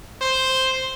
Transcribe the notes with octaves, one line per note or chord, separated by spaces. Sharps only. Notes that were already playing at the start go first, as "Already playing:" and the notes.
C5